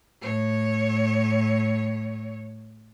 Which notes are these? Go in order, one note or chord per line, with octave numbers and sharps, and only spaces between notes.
A2 C#5